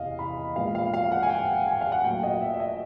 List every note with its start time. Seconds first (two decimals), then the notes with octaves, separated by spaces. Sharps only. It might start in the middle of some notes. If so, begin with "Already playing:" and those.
Already playing: E2 C3 D#5 F5
0.19 B5
0.56 A#2 F3 G#3 B3 F5
0.75 F5
0.94 F5
1.12 F#5
1.23 G#5
1.29 G5
1.67 G#5
1.81 F5
1.92 F#5
2.04 A#2 F#3 A3 G5
2.23 D#5
2.41 E5
2.54 E5
2.60 D#5